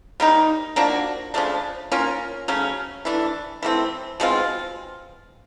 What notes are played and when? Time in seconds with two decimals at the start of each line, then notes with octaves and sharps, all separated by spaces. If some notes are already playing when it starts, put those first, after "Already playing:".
0.20 G3 A#3 D#4
0.76 F3 A#3 D4 F#4
1.34 C#3 F3 A3 D4
1.92 A#3 C#4 F4 A#4
2.48 C#3 F#3 A3 C#4
3.05 E3 A3 D4
3.63 E3 A3 C4
4.20 B2 G#3 C4 F4